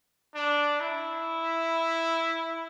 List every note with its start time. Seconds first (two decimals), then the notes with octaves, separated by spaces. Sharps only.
0.35 D4
0.81 E4